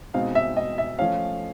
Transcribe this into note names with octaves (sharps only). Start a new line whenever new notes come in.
B2 G#3 C4 D#4 F5
E5
D#5
E5
F3 A3 C#4 F5